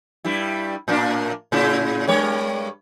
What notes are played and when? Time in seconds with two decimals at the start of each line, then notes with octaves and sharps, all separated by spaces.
0.25 G2 G3 E4
0.88 A2 A#3 D4
1.52 A2 C#3 E4
2.08 G2 G#3 C#5